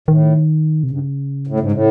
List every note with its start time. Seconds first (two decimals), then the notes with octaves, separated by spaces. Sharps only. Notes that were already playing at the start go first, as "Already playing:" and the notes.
0.08 A2 D#3
0.83 C3
0.91 G2 C#3
1.47 A2
1.60 G#2
1.72 A2